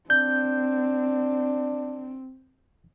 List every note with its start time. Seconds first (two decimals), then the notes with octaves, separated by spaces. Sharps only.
0.10 C4 D4 G6